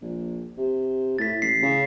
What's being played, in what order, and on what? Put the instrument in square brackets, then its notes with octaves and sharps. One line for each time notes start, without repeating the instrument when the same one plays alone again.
[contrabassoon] A#1
C3
[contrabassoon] A2 [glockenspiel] A6 B6
[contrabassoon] A1 [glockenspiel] B6 C7
[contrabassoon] C#3